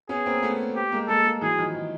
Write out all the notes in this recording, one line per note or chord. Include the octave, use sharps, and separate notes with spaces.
B3 C#4 G#4
A#3 C4
A3 B3
G4
G#3 A#3
G#3 A#3 A4
G#3 A#3
E3 F#3 G#4
D#3 F3
D#3